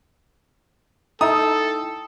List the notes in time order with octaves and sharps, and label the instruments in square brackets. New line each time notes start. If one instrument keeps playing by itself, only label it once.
[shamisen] A3 E5 A#5 [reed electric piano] D#4 E4 G5 [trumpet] A4 [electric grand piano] D#6